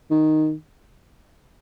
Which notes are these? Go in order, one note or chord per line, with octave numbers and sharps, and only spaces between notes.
D#3